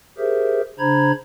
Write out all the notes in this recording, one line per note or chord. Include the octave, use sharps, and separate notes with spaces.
G4 G#4 A#4 C5 E5
C#3 D4 C5 A#5 B5 G#6